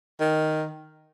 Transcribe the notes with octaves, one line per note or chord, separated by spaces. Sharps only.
D#3